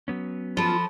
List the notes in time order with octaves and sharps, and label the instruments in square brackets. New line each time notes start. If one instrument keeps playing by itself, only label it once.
[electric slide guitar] F#3 B3 C#4
[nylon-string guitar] F3 A4 [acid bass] F4 [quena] B5